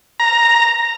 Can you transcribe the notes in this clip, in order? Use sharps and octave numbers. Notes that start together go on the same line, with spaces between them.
A#5